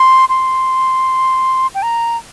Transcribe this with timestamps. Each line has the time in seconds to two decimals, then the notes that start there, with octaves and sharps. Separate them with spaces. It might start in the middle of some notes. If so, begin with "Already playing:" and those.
Already playing: C6
0.29 C6
1.75 G5
1.83 A#5